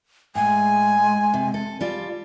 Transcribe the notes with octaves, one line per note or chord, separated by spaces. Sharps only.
A2 G#3 G#5
C3
A4
G3 F4 D5